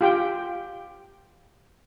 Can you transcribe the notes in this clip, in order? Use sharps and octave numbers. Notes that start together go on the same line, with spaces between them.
F4 G4 G5